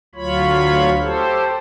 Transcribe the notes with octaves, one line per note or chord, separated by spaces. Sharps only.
D2 F#3 F4 C#5 B5
G4 A4 C5